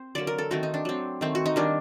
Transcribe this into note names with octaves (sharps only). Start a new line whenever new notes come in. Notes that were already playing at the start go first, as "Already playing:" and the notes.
Already playing: C4 C5
D3 F#3 A#3 D5
A#4
A4
D#3 A3 C4 F#4
D#4
D4
F#3 C4
D#3 A3 C4
F#4
D#4
D#3 G3 A#3 D4